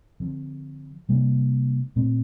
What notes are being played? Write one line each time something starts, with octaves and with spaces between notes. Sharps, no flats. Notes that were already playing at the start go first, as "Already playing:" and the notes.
D3 F3 C4
C3 G3 A#3 D4
A#2 A3 C4